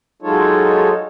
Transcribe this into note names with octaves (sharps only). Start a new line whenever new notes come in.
F#3 G#3 D#4 F4 A4 C#5